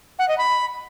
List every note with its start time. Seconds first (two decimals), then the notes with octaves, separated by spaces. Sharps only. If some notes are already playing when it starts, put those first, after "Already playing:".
0.19 F#5
0.28 D#5
0.38 B5